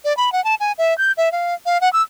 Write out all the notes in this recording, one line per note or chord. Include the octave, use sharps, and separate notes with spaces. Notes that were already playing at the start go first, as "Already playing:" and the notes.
D5
B5
F#5
A5
G#5
E5
G6
E5
F5
F5
F#5
E6